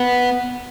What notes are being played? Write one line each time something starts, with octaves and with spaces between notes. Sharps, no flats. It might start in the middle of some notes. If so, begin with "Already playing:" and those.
Already playing: B3